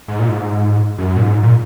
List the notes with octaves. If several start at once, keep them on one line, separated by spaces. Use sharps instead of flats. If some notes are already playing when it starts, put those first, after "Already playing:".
G#2
A#2
G#2
F#2
A#2
G#2
A#2